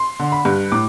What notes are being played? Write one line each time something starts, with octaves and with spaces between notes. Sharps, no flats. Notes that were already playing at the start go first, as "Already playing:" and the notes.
Already playing: C6
D3
B5
G2
A2 D6